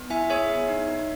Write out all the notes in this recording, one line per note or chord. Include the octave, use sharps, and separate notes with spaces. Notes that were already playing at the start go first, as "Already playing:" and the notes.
Already playing: B3
E4 E5 G#5
G#4 C#5 E5
B3
D#4
D#4